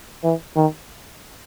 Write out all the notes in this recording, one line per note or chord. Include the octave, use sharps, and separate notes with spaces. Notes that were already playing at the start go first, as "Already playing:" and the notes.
E3
D#3